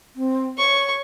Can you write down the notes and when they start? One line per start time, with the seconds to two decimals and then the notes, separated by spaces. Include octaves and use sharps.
0.16 C4
0.58 C#5 C#6